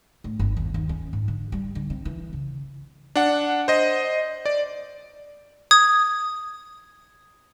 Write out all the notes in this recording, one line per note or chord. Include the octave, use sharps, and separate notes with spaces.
A2
G1
D#2
D#2
C#4
G#2
D3
G3
D3
C4
E3
C#3
D4 F#5
C5 D#5
D5
D#6 G#6